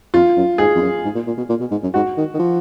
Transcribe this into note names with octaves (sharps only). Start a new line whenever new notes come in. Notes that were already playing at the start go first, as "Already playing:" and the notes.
F2 F4
F#2
G#2 G#4
F2
F#2
G#2
A#2
A#2
B2
A#2
B2
G#2
F#2
G#2 F#4
D#3
D#3
F3